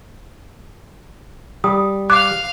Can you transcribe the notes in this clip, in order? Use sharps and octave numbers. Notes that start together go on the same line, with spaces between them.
G3 D#6
F5 D6 F6 F#6